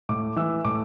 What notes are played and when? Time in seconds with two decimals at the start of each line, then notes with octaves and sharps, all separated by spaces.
0.09 A2 D6
0.36 E3 E6
0.65 A2 D6